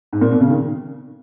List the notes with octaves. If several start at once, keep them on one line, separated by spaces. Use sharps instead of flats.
G#2
A#2
B2
C#3
D#3